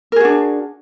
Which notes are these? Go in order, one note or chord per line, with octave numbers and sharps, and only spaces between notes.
D4 F#4 G#4 A#4